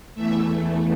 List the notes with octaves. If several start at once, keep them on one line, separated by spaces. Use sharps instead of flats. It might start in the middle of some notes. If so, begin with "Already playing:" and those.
E2 E3 A3 E5